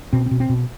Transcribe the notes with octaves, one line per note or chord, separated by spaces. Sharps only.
B2 C4
C4
B2
C4
B2